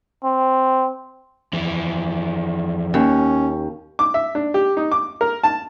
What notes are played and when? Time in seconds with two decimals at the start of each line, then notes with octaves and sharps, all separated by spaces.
0.24 C4
1.53 F2 E3
2.94 D#2 C#4
3.99 D6
4.14 E5
4.35 D4
4.54 G4
4.77 D#4
4.92 D6
5.21 A#4
5.44 A5